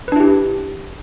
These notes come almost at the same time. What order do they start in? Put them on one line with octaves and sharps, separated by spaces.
B4 D4 E4 G4